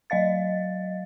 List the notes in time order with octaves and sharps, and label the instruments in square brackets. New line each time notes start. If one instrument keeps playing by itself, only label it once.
[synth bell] F#3 D#5 F5 A6